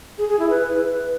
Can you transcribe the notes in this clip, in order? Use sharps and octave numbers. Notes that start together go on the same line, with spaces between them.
G#4
G#4
E4
B4